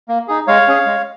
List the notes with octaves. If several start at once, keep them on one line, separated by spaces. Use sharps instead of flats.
A#3
D#4 G#4
G#3 C#5 F5
C#4 G#4
G#3